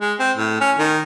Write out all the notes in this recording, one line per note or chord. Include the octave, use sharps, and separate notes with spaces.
G#3
C4
A2
C#4
D#3